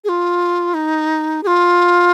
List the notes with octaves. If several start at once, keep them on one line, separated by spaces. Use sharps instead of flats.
G#4
F4
D#4
G#4
F4